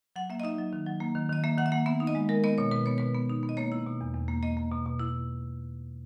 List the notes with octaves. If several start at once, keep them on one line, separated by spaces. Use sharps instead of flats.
F#3 F#5
A#3 E5
D#5
D#4 E5
F#3
D#3
F#3
A#3
D#3
D#3 D#5
A#3 E5
D#3 F#5
E5
A#3 F#5
B3 E5
D#4
D#5
G#3
G#3 A#4
B3 D#5
B2 C#5
B2 B4
B3 C#5
B2 B4
B3
D#4
B3
D#5
A#3 C#5
E4
B2
E2
E2
A#3
A#3 D#5
A#3
B2
B2
E4